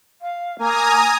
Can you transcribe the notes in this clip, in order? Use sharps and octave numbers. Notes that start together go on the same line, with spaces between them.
F5
A#3 G#5 A#5 D#6